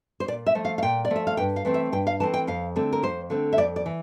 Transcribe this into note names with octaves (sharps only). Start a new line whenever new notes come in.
C5
A#2 D5
E5
F3 A3
F5
F5
A#2 G5
D5
F3 A3
E5
F5
G2 G5
F5
E3 A3 C4
E5
G2 G5
F5
E3 A3 C4 A5
G5
F2 F5
D3 A3 C4
A#4
F2 C5
D3 A3 C4
E5
F2 D5
D5
E3